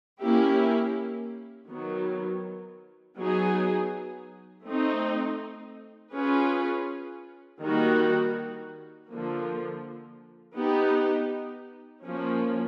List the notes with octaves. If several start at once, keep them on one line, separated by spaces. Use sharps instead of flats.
A#3 C#4 E4 G4
D#3 F#3 B3
F#3 B3 D#4 G#4
A3 C4 D#4
C#4 F4 G#4 B4
D#3 G3 A#3 D#4 F#4
D3 F3 A#3
B3 D#4 G4
F3 A#3 C#4